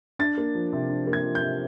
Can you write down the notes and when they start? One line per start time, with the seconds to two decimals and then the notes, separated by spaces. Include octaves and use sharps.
0.19 D4 A6
0.37 A#3
0.55 F3
0.73 C3
0.89 D4
1.07 A#3
1.13 G#6
1.24 F3
1.35 G6
1.41 C3